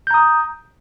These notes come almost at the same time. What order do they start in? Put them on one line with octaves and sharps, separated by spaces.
G6 A#5 D#6